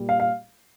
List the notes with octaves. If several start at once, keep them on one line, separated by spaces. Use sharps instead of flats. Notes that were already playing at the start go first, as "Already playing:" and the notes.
Already playing: A#2 G3
F5
F5